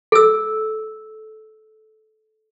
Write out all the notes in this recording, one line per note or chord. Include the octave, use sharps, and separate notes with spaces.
A4 E6